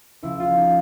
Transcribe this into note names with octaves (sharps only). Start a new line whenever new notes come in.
C#2 C#3 F3 E4
F4
D#4